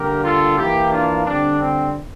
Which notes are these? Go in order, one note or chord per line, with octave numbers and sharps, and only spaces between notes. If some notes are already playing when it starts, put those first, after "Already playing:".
Already playing: D3 G3 A#3 G4 A#4
F4 A4
E3 A#3 E4 G4
D4 F4
D3 G3 C4 D4
C4